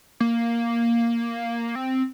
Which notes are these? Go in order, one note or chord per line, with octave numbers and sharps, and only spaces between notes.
A#3
C4